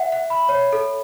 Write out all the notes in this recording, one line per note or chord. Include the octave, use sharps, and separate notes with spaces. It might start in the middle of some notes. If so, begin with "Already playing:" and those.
Already playing: E5 F#5
F#5
B5
C#5
A4